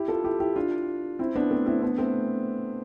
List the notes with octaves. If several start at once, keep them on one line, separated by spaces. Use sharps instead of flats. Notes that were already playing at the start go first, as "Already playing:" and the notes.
Already playing: E4 G4
F4 A4
E4 G4
E4 G4
D4 F4
C4 E4
B3 D4
A3 C4
C4 E4
B3 D4
A3 C4